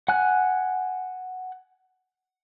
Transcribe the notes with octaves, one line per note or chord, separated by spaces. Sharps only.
F#5 G#5 F#6